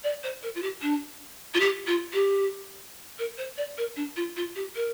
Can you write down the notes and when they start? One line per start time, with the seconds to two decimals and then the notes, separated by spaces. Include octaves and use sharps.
0.03 D5
0.23 C5
0.42 A#4
0.55 F4
0.62 G4
0.82 D4
1.54 F4
1.60 G4
1.87 F4
2.13 G4
3.18 A#4
3.37 C5
3.57 D5
3.77 A#4
3.96 D4
4.16 F4
4.36 F4
4.55 G4
4.75 A#4